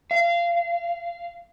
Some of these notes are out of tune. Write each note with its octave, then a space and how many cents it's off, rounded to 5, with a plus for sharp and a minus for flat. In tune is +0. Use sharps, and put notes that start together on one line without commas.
F5 -20